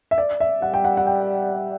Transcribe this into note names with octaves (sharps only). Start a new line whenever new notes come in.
E5
D5
E5
G3 F#5
G5
F#5
F#5
G5